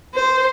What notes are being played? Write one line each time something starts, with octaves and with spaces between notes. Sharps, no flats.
C5